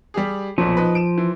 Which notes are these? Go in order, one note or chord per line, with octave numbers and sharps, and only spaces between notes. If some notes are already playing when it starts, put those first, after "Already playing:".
G3 G4 G#4
B1 A#2 F3
D#4 B4
D7 E7
E3